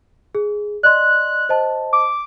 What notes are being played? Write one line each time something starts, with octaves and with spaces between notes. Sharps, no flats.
G#4
D5 D#5 C6 F#6
C5 D#5 A5
D6